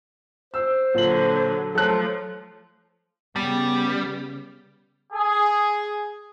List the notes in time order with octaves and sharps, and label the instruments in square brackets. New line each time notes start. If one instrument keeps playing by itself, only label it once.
[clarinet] C5 [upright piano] E6
[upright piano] A#2 F#7 [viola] D3 F#3
[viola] F3 A3 [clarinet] F#3 [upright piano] A4 F#6
[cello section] C#3 B3 [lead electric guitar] G3
[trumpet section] G#4